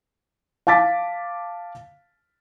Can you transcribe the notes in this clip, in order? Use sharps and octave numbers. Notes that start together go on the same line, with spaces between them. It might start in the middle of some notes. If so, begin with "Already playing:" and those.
F5 A5 D6 A6 B6